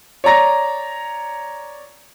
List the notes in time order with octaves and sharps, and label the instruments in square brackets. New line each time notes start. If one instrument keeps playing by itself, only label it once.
[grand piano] C#5 D5 A#5 A#6